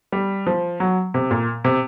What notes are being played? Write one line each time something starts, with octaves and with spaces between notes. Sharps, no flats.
G3
F3
F#3
C3
A#2
C3